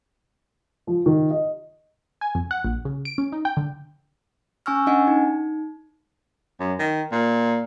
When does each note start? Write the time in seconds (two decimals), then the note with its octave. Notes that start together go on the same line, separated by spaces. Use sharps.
0.87 F3
1.06 D#3
1.31 D#5
2.21 G#5
2.35 F2
2.51 F#5
2.64 A#1
2.85 C#3
3.05 D7
3.18 C#4
3.32 D#4
3.45 G5
3.57 D3
4.66 C#4 G#5 C#6 E6 F6
4.87 C#4 D4 D#5 F#5 G#5
5.07 D#4
6.60 F#2
6.79 D#3
7.12 A#2